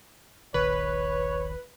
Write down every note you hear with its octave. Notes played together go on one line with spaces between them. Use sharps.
D#1 A#1 D#3 B4 C#5